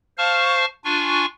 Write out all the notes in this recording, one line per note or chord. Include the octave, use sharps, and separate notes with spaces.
C5 F5 A5 C#6 F6
D4 F4 G#5 C#6